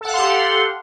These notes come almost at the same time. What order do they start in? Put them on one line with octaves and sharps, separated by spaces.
A4 F#5 F5 C6 G4